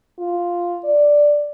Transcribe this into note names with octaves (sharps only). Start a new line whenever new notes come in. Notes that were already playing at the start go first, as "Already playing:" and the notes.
F4
D5